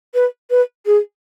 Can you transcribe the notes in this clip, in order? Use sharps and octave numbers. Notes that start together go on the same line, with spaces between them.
B4
B4
G#4